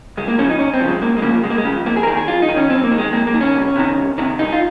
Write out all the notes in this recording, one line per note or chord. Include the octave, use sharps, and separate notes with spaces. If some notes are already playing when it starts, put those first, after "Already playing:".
C#2 G#3
A#3
C#3 F3 C#4
D#4
C#2 C#4
C4
C#3 F3
G#3
C#2 A#3
G#3
C#3 F3 A#3
C#2 G#3
A#3
G#3
C#3 F3
F2 A#3
G#4
A#4
D#3 G#4
G#4
F2 F4
D#4
D#3
C#4
F2 C4
A#3
D#3
G#3
F2 A#3
A#3
D#3
C#4
C2
C3 D#3
C2
C3 D#3
C2 D#4
F4